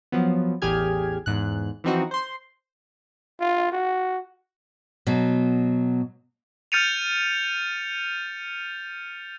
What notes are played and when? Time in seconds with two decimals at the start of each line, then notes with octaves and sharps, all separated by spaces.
0.12 F3 F#3 B3
0.62 A1 E2 G4 G#4 F6 G#6
1.26 E2 G#2 F#6
1.84 E3 F3 C4 D#4 F#4
2.11 C5 C6
3.40 F4
3.72 F#4
5.07 B2 F#3
6.72 F6 G6 A6 C#7 D#7 F7